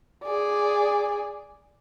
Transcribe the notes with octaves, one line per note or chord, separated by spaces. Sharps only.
G#4 D5